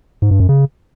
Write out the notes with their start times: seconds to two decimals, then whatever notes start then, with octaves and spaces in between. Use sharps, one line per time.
0.22 G#2
0.31 G2
0.40 F#2
0.49 C#3